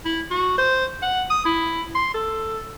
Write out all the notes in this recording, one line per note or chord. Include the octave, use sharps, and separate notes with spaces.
E4
F#4
C5
F#5
D#6
E4
C6
A4